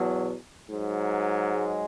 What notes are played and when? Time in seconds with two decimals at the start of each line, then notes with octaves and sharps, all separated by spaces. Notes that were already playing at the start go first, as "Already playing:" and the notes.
Already playing: E2 B2 F#3
0.68 G#2 F#3
1.52 G#3